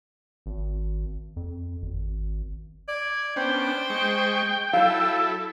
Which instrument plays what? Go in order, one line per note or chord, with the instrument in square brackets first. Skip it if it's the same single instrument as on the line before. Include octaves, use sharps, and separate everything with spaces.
[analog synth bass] G#1
F2
G#1
[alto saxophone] D5 [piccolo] G#6
[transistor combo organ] B3 C#4 D4 [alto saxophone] C5 [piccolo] G5
[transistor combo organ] G#3 C#6
[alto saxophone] F#3 [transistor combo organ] E4 A4 [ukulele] F5